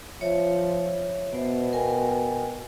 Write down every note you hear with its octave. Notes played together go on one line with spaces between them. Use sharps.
F3 C#5 E5
B2 B3 C5 E5
A#4 G5 G#5